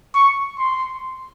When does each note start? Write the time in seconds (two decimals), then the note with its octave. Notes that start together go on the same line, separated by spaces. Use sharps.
0.15 C#6
0.59 C6